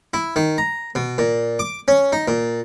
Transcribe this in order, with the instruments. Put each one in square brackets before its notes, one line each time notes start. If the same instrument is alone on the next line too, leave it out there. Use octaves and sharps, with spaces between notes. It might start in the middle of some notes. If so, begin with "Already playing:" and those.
[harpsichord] E4
D#3
A#5
B2
A#2
D6
C#4
D#4
A#2